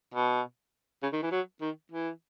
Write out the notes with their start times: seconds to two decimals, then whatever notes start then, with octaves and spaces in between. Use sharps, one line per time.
0.14 B2
1.03 C#3
1.13 D#3
1.23 E3
1.32 F#3
1.62 D#3
1.92 E3